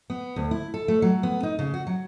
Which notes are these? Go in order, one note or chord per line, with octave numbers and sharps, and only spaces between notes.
B3
D2
E4
A4
A3
F#3
B3
D#4
C#3
F#4
F#3